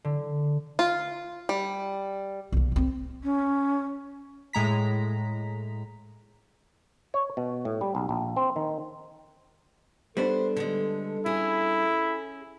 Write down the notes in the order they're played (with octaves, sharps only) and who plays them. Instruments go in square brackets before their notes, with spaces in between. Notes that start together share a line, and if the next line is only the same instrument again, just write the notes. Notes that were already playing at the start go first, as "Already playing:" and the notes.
[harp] D3
[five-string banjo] F4
G3
[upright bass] B1 A#3
D2 C4
[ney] C#4
[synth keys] A2 G#3 A#5 B6
[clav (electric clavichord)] C#5
B2
A2
G3
B1
A#1
C4
D#3
[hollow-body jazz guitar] G3 B3 D4 [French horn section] A4 [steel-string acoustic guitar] C5
[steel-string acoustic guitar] D3 G#3
[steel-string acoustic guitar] C#4 G#4 [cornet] E4